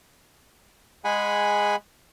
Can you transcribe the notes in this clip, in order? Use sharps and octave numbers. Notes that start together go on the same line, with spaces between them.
G#3 G#4 F#5 G#5 B5